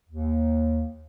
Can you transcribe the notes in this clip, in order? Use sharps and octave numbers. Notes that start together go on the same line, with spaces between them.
D#2